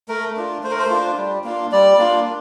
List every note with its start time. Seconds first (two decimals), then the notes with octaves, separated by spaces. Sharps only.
0.08 A3 A#4
0.37 D4 F4
0.63 A3 C5
0.71 A#4
0.79 C5
0.90 D4 F4
1.17 G3
1.44 A#3 D4 F4
1.72 G3 D5
1.99 A#3 D4 F4